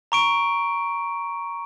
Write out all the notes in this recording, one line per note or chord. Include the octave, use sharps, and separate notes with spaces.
A#5 C#6 D7